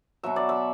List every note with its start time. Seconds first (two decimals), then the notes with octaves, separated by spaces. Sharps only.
0.23 B2 F#3 E5
0.36 D5
0.49 E5